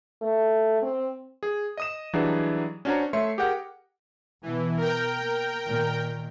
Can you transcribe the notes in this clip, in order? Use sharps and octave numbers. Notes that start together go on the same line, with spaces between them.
A3
C4
G#4
D#5 D#6 E7
E3 F#3 G3 D4 D#4 G#4
C#4 D4 F#4 C5 C#5 A#5
A3 C#5 E5 C6 C#7
G4 G#4 A#4 F#5 G5
B2 E3
A#4 G5
A#3
A#2 D#3